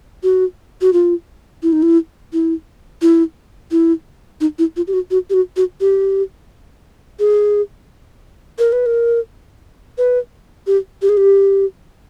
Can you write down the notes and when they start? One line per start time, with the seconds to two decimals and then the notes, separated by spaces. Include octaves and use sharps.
0.23 F#4
0.82 F#4
0.93 F4
1.63 E4
1.73 D#4
1.83 E4
2.33 E4
3.02 E4
3.71 E4
4.41 D#4
4.59 E4
4.77 F4
4.87 G4
4.93 F#4
5.11 F#4
5.30 G4
5.34 F#4
5.57 F#4
5.80 G4
7.19 G#4
8.59 A#4
8.72 B4
8.86 A#4
9.98 B4
10.67 G4
11.02 G4
11.09 G#4
11.17 G4